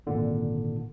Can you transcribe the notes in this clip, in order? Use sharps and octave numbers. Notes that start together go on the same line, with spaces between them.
G#1 A#2 D3